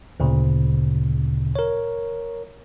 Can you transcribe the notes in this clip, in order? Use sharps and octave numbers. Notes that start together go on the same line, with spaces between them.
D2 A#2 C#3
A#4 C#5